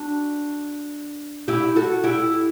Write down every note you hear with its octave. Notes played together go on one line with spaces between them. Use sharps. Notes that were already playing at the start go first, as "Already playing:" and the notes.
Already playing: D4 F#4
E4 G4
F#4 A4
E4 G4